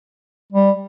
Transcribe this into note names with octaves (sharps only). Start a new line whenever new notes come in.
G3